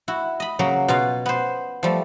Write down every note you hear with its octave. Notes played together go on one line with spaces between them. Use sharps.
E4 F#4
D#5 B5
C#3 F#3 A#3
B2 F4 F#4 F5
B3 C5
F3 G3 A3